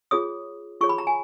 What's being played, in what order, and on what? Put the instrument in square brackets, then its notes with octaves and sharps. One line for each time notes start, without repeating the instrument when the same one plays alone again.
[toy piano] F4 G#4 C#5 D#6
F4 G#4 C#5 C#6
B5
A#5
G#5